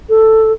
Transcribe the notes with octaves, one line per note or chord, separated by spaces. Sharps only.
A4